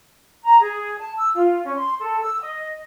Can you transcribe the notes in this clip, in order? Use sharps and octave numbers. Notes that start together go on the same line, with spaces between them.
A#5
G#4
A5
E6
F4
C#4
C6
A4
E6
D#5